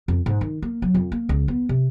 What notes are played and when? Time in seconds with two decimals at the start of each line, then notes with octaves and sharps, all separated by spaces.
0.08 F2
0.26 G#2
0.41 D#3
0.62 A#3
0.82 F#3
0.94 F2
1.12 A#3
1.29 C#2
1.48 B3
1.69 C3